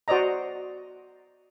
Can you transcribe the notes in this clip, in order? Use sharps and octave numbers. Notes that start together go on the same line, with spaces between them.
F#4 C5 D5 D#5 A#5